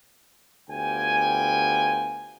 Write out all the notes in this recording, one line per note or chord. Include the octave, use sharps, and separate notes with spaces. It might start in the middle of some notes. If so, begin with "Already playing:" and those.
D2 B3 F4 G4 G5 G#5